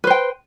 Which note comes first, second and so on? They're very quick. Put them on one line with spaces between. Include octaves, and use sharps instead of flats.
B4 C5 G5